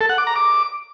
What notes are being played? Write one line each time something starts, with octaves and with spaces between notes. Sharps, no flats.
A4
F#5
D6
A#5
D6